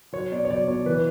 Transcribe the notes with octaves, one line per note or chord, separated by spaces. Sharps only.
F#3 C#5
B2 D5
C#5
F#3 D5
B2 C#5
E3 B4